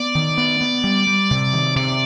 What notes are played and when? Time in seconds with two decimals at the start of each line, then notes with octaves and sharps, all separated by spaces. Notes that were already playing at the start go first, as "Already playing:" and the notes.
Already playing: B3 D5
0.15 D#3
0.38 B3
0.61 B3
0.84 G3
1.07 G3
1.31 C3
1.53 D#3
1.76 C3 D5